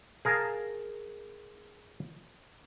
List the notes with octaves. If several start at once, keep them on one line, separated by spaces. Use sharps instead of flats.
G#4 A#4 F5 G#5 A5